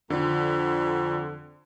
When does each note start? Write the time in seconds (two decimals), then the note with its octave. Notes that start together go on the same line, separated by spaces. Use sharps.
0.10 F2 D3